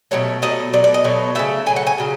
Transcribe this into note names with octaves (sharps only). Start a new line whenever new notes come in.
B2 F#3 A3 C#5
B2 F#3 A3 D#5
B2 F#3 A3 D5
D5
D#5
B2 F#3 A3
C#3 F#3 A3 E5
C#3 F#3 A3 G#5
F#5
G#5
C#3 F#3